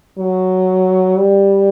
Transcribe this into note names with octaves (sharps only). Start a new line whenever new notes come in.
F#3
G3